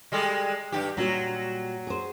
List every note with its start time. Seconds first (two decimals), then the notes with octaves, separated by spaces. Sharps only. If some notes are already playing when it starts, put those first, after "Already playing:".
0.12 G3 G#3 A4
0.72 G2 A#2 G4
0.97 A#2 F#3 G3 F#4
1.87 G#4 C5